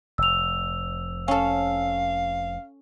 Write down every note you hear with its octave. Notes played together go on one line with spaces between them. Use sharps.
F1 E6 F7
C#4 A4 F5